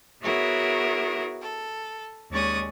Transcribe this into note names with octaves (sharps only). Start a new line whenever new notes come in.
B3 E4 F#4 G#4 A#4 C#5
A4
D#2 G#3 C#4 D5 C#6 D#6